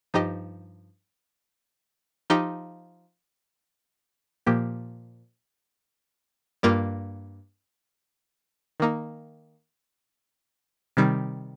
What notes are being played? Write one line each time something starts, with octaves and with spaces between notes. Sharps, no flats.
G2 F3 D#4 G4 D#5
F3 D#4 G4
A#2 F3 A#3 G4
G2 G3 A#3 F4
D#3 A#3 D#4
C3 D#3 G3